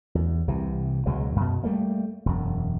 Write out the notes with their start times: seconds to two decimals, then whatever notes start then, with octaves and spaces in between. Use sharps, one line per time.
0.15 E2
0.48 C2 C3 E3
1.06 C#2 B2 F#3 G#3
1.36 F#2 B2
1.63 G3 A3 A#3
2.26 E1 F#2